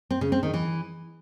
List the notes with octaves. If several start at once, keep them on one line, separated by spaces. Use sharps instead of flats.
C4
C#3
C4
D#3
E3